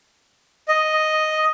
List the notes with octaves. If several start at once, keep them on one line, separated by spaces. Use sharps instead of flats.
D#5